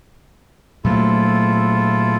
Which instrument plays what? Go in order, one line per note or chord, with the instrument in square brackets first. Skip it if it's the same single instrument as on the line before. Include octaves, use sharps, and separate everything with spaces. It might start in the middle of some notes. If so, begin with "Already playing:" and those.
[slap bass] A#2 F#3 A3 [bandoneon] E4 F4 A4